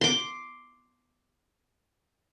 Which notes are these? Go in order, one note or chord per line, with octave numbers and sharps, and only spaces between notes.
C6 D6